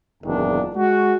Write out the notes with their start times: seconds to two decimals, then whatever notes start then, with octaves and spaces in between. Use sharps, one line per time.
0.24 F#1 E2 A#2 D#3 D4
0.76 G#3 F#4